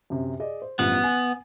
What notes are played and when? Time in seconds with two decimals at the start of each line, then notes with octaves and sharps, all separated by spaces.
0.10 F#2 C3
0.40 G#4 D5 D#5
0.62 C5
0.79 A1 G2 F3 B3
1.04 G#5